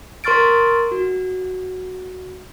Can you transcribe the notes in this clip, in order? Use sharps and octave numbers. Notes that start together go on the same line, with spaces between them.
A#4 C6 C#6 F6 A6 D7
F#4